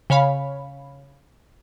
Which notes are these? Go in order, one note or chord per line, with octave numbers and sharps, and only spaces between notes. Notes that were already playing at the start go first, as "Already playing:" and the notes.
C#3 C#5 F5 B5